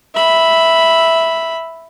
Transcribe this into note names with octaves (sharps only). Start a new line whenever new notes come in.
E5 B5